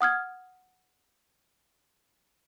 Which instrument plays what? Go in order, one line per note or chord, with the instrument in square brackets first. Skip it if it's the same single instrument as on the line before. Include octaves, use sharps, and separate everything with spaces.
[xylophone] F#5 D#6 F6 G#6